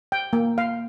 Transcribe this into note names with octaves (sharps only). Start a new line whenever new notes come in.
G5
A#3
F5